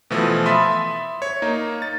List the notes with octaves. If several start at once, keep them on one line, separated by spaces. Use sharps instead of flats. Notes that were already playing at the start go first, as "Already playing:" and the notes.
B2 E3 F3 A3
E5 B5 C6 D#6 A6 B6
C#5
A#3 D#4
A6